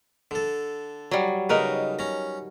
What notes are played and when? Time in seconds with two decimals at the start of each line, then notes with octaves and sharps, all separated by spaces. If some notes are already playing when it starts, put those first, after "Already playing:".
0.31 D3 A4
1.11 F#3 G3
1.49 C#3 D#4 A#4 B4
1.99 C#4 A#5